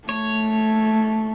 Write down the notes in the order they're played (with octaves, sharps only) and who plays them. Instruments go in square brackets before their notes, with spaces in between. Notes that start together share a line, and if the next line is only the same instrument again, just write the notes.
[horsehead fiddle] A3 [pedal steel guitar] C#5